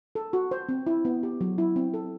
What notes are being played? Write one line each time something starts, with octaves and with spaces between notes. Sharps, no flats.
A4
F#4
C5
C4
E4
B3
G4
F#3
E4
C4
A4